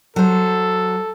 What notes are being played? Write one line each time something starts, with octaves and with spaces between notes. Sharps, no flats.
F#3 A4 C5